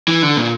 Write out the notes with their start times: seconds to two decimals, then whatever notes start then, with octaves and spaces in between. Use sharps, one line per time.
0.08 E3
0.23 D3
0.37 A#2